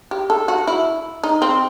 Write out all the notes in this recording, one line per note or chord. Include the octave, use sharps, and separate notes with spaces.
G4
A4
F#4
E4
D#4
C4